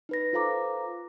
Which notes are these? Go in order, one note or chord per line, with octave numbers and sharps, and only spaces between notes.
D#4 B4 A#6
F4 A4 C5 F5 A#5 D6